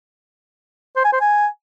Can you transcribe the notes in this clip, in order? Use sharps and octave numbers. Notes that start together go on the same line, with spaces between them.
C5
G#5
C5
G#5